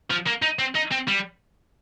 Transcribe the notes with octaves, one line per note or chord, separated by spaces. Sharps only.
F3
A#3
D#4
C4
D#4
C4
G3